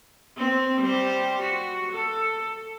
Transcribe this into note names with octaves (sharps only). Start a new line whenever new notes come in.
C4
G3 G4 C5
F#4
A4